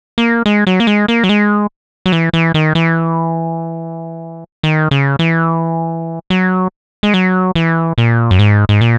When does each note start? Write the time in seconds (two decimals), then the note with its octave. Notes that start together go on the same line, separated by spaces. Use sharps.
0.18 A#3
0.46 G#3
0.67 F#3
0.80 A#3
0.87 G#3
1.08 A#3
1.24 F#3
1.29 G#3
2.06 F#3
2.12 E3
2.33 E3
2.54 D#3
2.75 E3
4.63 D#3
4.91 C#3
5.19 E3
6.30 F#3
7.03 G#3
7.14 F#3
7.55 E3
7.98 A#2
8.31 F#2
8.39 G#2
8.69 G#2
8.81 A#2